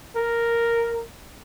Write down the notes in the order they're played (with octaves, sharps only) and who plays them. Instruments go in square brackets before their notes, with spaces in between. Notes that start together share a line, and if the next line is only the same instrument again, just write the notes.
[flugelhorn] A#4